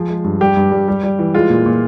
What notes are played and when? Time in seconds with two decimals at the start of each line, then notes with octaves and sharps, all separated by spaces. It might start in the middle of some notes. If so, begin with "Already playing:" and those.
Already playing: F3 G#4
0.09 G#3
0.24 G2
0.40 G3 G4
0.57 G2
0.71 G3
0.88 G3
1.03 G3
1.19 E3
1.34 G#3 F4
1.50 A#2
1.66 A#2